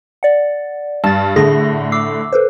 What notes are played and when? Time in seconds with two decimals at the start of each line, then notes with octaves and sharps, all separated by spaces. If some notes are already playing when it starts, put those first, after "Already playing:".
0.23 D5 F#5
1.04 G2 A5 A6
1.36 A2 D3 G#4 A#6
1.92 D6 E6 C7
2.33 A4 B4 C5